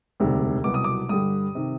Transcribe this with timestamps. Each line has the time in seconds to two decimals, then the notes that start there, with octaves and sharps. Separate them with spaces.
0.20 E1 D2 C3 D#3 G3
0.64 C2 B2 F#3 B3 D6
0.74 D#6
0.84 D6
1.09 G2 D3 G3 D#6
1.55 C3 D#3